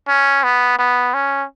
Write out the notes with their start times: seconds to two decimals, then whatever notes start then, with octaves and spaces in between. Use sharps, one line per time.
0.09 C#4
0.44 B3
0.79 B3
1.14 C#4